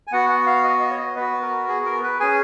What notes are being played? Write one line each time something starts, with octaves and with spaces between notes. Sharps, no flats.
G#5
B3 F#4 F#5
F#5
F5
D#5
D#5
C#5
D#5
B3 F#4 B4
A#4
G#4
A#4
B4
C#4 G#4 G#5